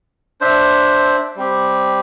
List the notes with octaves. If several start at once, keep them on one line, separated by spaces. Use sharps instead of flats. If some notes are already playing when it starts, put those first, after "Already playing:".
D4 C5 E5
G3 C4 G4